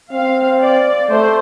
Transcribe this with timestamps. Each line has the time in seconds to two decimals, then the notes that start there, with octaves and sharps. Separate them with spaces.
0.12 C4 F5
0.61 D5
1.10 A3 C5